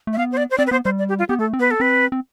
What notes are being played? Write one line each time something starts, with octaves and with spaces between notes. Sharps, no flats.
A3
E5
B3 F5
C5
D5
C5
C4 D5
B4
B3 C5
G3 C5
D5
G4
F4
B3 G4
A3 A4
C4
B3 B4
A4
C4 B4
C4